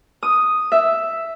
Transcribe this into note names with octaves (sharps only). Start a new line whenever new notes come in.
D#6
E5